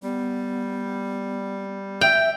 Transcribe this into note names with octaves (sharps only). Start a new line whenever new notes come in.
G3 B3
E5 G5